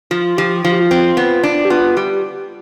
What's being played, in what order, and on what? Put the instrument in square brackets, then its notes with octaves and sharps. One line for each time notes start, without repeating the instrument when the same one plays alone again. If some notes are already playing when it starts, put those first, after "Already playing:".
[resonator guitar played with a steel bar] F3 [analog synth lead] F4
[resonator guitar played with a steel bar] F3 [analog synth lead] G4
[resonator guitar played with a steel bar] F3 [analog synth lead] F4
[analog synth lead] G4
F4
[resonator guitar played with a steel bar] C4
B3
D4
[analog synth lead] G4
[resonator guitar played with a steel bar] B3 [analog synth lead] F4
[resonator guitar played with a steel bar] G3 [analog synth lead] G4